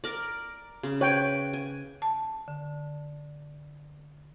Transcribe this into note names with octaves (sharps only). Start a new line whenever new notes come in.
A#4 D5
C#3
B4 C#5 G5
G#5
A5
D3